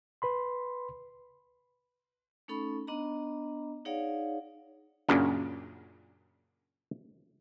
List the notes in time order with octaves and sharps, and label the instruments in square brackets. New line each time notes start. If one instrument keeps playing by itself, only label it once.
[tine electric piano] B4 B5 C6
[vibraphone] A3 C#4 D#4 A4 B5 C#6
B3 D4 D#5 A#5
D#4 G#4 C#5 D5 F5 F#5
[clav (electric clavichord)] F#2 A#2 C#3 D4